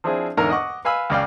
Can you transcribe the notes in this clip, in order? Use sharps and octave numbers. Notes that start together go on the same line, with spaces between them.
F3 C4 D4 E4 G#4
E2 G#2 D3 A#4 A#5 F6
D#5 F#5 C#6 D6
B4 F5 G#5 B5 E6
C#2 C#3 D5 F5 G5